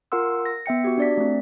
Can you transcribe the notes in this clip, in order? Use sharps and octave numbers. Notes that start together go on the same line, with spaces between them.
F4 A#4 F#5 C6 E6
A#6
B3 E5 G5 C#7
F#4 G4
D4 D5 B6
A3 C4